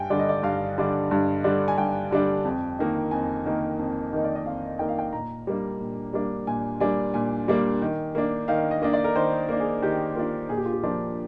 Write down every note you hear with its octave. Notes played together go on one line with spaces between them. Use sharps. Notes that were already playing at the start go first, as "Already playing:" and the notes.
Already playing: G2 G5 G#5
D3 G3 D4 D5
D#5
D5
G2 F5
D3 G3 D4
G2
D3 G3 D4
G#5
G2 G5
D3 G3 D4
F2
D#3 A#3 D#4
F2 G#5
D#3 A#3 D#4
F2
D#3 A#3 D#4
D5
D#5
F2 F5
D#3 A#3 D#4 G5
F5
G5
A#2 A#5
G3 A#3 D4
A#2
G3 A#3 D4
A#2 G#5
G3 A#3 D4 G#5
A#2 G#5
G3 A#3 D4
D#3
A#3 D4
D#3 F5
D#5
A#3 D4 D#5
D5
A#4
D#3 C5
A#3 D4
G#4
D#3 G4
A#3 D4 F4
A#2 G#4
G4
F4
G4
F3 A#3 D4 F4